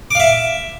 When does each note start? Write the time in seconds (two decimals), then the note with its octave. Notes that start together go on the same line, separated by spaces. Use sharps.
0.11 D6
0.15 F5
0.19 E5